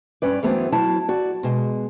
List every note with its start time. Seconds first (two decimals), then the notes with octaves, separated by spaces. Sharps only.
0.22 G2 C#4 B4 D5
0.43 E3 F#3 A3 B3 C4
0.72 F#3 E4 A5
1.08 F#4 D5
1.43 B2 G#3